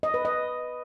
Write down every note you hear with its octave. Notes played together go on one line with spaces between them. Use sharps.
D#5
B4
D#5